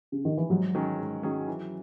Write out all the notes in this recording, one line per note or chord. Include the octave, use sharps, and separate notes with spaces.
C#3
D#3
E3
G#2 F#3
D#3 F#3 C#4 G#4
G#2
D#3 F#3 C#4 G#4
E3